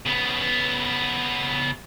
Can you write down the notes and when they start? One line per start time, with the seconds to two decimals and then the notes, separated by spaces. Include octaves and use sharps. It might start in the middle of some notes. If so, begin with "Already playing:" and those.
0.06 C#3 B3